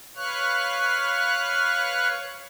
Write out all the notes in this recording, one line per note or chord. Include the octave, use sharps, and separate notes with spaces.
B4 C#5 F5 C#6 F6 F#6